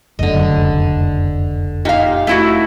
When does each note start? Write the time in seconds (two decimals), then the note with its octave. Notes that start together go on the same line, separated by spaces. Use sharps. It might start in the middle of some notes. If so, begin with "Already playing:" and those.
0.19 F1 C#2 F#2 D3 D#5
1.85 A#2 D#4 G4 F5
2.27 A3 E4 F#4